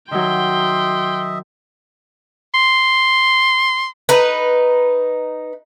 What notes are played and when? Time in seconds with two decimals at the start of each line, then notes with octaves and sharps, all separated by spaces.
0.11 D#3 F#3 D#5 E5 G5 C6
2.54 C6
4.09 D#4 B4